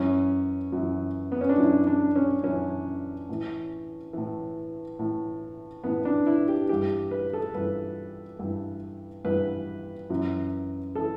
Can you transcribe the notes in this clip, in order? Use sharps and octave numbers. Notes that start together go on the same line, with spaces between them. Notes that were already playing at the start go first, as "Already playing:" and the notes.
Already playing: F#2 E3 C#4
F#2 E3
B3
C#4
D4
F#2 E3 E4
D4
C#4
F#2 E3 C#4
A2 E3
A2 E3
A2 E3
A2 E3 B3
D4
E4
G4
G2 E3 G4
B4
A4
G2 E3 B4
G2 E3
G2 E3 B4
F#2 E3
E3 A4